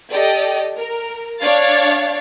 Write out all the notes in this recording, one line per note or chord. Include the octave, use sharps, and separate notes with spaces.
G4 A4 D5 D#5 G5
A#4
D4 C#5 D5 F5 A6